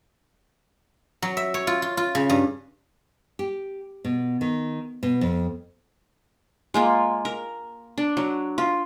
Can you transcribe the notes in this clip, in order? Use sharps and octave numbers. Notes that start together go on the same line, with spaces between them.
F#3
E5
C#5
F4
F4
F4
C#3
G2
G4
B2
D#3
B2
F2
G#3 A#3 F4
A#4
D4
F#3
F4